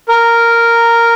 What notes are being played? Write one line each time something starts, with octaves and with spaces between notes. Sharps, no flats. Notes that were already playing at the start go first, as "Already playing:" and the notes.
A#4